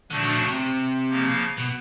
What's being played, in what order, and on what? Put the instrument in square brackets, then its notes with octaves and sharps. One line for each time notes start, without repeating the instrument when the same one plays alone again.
[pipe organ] A#2 F3 A3 D4 F#4 [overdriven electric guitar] D3
[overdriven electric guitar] D3
C#3
C3
[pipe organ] C#3 F3 A#3
[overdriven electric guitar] B2